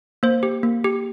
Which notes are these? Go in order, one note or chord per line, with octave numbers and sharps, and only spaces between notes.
A#3 C5
G4
A#3
G4